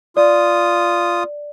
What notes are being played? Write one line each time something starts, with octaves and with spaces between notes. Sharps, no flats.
F4 D5 D#6